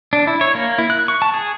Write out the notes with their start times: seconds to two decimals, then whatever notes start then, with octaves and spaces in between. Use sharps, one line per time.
0.13 D4
0.27 E4
0.41 C#5
0.55 A#3
0.78 E4
0.90 F#6
1.08 C#6
1.22 A5
1.34 G#4